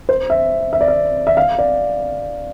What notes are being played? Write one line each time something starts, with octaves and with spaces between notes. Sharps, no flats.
C5
E5
E5
D5
E5
E5
F5
D5